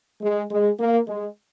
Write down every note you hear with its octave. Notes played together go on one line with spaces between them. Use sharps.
G#3
G#3
A#3
G#3